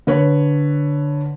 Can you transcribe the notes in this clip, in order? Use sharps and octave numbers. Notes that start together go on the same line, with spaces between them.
D3 B4 C#5